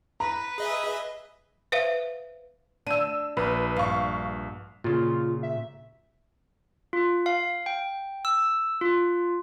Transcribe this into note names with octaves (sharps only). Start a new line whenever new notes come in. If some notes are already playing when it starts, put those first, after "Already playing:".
B4 A#5
G#4 D#5 E5
B4 C5 E5 F5
D4 E6 D#7
A#1 B4
G2 F5 C#6
A#2 C#3 F4
E5
F4
F5
G5
E6
F4